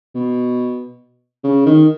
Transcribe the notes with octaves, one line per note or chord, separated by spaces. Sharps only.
B2
C#3
D#3